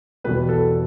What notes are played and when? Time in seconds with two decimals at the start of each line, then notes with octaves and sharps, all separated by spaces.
0.24 E2 B2 G3 B3 B4
0.49 A4